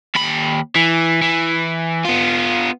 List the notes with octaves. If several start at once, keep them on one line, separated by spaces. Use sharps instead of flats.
D#2 B5
E3
E3
B3 F4